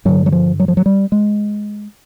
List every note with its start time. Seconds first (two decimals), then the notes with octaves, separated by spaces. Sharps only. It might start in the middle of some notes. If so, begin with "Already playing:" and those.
0.05 G2 D3 F#3
0.26 F#3
0.32 F3
0.60 F#3
0.68 F3
0.77 F#3
0.86 G3
1.12 G#3